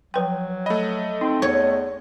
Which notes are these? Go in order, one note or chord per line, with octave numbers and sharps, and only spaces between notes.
F3 F#3 B4 G5
A3 D#5 B5
C4 D#4
E2 C#5